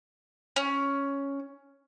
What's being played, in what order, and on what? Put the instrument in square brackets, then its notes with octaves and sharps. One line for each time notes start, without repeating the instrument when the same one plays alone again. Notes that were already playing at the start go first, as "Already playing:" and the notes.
[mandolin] C#4